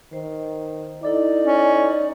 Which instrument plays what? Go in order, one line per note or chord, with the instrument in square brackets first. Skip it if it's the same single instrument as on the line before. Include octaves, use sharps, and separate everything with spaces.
[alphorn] D#3 [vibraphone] C5
[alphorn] D#4 [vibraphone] E4 A4 D6 [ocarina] D5
[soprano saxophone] C#4